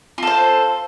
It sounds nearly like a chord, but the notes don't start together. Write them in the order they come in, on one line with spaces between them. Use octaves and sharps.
F4 A4 C5